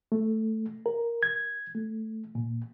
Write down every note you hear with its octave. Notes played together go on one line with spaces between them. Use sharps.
A3
A#4
G#6
A3
A#2